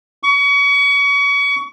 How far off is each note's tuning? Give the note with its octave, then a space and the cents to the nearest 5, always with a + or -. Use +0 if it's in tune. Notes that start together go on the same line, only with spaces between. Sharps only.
C#6 +30